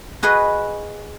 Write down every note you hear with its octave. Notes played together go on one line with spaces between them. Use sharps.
F#4 G#4 B4 D#5 F#5